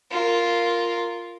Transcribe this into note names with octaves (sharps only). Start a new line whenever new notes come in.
F4 A#4